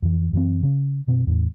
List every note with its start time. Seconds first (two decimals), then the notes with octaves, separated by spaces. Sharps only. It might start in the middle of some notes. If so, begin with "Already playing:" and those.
0.02 F2 E3
0.33 F#2 E3 C4
0.63 C#3 C#4
1.07 F#2 B2 C4
1.27 E2 A2